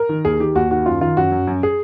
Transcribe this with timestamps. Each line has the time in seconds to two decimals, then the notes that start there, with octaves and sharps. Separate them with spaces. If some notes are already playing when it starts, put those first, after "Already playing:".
Already playing: A#4
0.09 D#3
0.25 D#2 G#4
0.40 D#3 G4
0.55 D#2 F#4
0.71 D#3 F#4
0.86 F#2 F4
1.01 D#3 F4
1.17 F#2 F#4
1.32 F#2
1.47 F#2
1.63 G#4